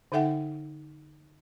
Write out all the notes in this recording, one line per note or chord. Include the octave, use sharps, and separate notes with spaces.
D3 D#4 A4 E5 F#5 G5